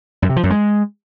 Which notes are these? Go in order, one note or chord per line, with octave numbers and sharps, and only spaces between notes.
F#2
C3
F3
F#2
G#3